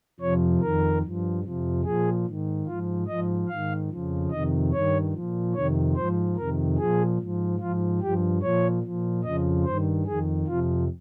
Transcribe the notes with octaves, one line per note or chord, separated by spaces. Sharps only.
F2 C3 F3 C#5
F2 D#3 A#4
G2 F3
F2 C3 F3
A#2 F3 G#4
G#2 D#3
G#2 F3 F4
G#2 F3 D#5
G#2 D#3 F5
F2 C#3 F3
F2 C3 D#3 D#5
G2 D#3 C#5
A#2 F3
F2 C3 D#3 C#5
G#2 F3 C5
F2 C3 D#3 A#4
A#2 F3 G#4
G#2 F3
G#2 F3 F4
G2 F3 G4
A#2 F3 C#5
A#2 F3
F2 C#3 F3 D#5
G2 D#3 C5
F2 D#3 G#4
F2 C3 F3 F4